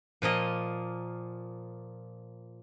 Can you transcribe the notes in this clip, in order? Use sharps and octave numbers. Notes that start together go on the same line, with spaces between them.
A#2 F3 A#3 D#5